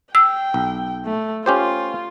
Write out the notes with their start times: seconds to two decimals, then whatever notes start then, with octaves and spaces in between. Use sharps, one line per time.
0.15 G5 E6
0.54 B1
1.06 A3
1.46 C#4 F4 G4 C5